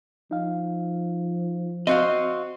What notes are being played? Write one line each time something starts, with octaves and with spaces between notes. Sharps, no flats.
F3 D#4 F5
C4 F#4 D#5 F5